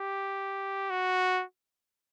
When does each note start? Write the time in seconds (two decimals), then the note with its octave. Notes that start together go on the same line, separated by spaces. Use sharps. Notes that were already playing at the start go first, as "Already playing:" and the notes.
Already playing: G4
0.90 F#4